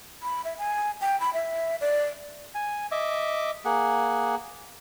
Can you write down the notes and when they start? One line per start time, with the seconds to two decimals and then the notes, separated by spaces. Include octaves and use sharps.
0.23 B5
0.45 E5
0.58 G#5
1.01 G5
1.20 B5
1.34 E5
1.81 D5
2.55 G#5
2.91 D#5 E5 D6
3.65 A#3 G#4 F#5